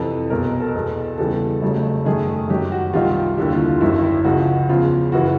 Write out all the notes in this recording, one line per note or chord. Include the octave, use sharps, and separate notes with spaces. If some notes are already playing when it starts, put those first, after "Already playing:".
Already playing: F2 C3 E3 A4
B1 B2 G#3 A#4
A4
E2 B2 G#3
E2 C#3 E3 G3 A4
F1 F2 C#3 F#3 A3
F#2 D#3 F#3 A3 G#4
G#4
F#2 D#3 F#3 G4
F#4
C2 C3 D#3 G3 F4
F4
D#2 D3 G3 E4
F4
F4
G#1 F#2 D#3 E4
E4
C#2 C#3 F3 G#3 F#4
E2 C#3 F3 F4
F#2 C#3 E3 F#4